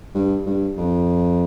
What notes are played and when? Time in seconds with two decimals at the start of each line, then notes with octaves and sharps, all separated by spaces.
0.15 G2
0.46 G2
0.77 F2